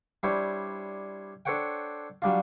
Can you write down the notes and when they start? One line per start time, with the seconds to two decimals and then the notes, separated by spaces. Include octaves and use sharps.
0.23 G3 D4 E4 C5 C#5
1.45 D4 A4 C5 C#5 F#5 G5
2.22 F#3 G3 D4 F4